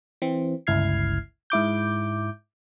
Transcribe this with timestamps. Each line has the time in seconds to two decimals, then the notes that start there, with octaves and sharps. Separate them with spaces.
0.22 E3 C4
0.67 G1 C#2 E4 F6 G#6 C7
1.50 G#2 E4 D6 G6